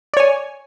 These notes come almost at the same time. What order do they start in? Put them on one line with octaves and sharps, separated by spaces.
D5 C#5 G#5